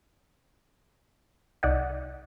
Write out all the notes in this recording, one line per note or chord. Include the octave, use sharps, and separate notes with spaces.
C2 D#4 D5 F#5